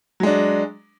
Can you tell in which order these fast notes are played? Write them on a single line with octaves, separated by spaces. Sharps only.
F#3 G#3 D4